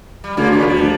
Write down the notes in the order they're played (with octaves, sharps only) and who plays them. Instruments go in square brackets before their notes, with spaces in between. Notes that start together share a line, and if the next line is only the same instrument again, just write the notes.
[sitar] G3
[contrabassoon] D2 [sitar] C#3 G#3 A#3
[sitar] A#2 D#3 B3
[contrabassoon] D2 [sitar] F3 G3